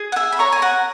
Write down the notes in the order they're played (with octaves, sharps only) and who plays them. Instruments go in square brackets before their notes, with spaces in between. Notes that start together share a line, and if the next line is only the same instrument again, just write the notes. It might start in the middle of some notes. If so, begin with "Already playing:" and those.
Already playing: [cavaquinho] G#4
F#5
E5 G#5
B5
C#5 A#5 C#6
G#5
F#5 A#5